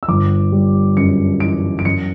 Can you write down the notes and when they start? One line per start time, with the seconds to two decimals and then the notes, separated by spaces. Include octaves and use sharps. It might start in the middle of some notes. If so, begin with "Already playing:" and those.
0.03 E6
0.08 G1 D6
0.52 G3
0.97 F#2 C#7
1.40 E3 D7
1.79 D7
1.85 F#2 C#7